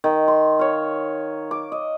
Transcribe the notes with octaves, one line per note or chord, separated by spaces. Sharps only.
D#3
C6
C#5 F5
D6
D#5